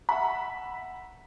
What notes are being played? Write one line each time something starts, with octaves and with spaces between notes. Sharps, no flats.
E5 F#5 B5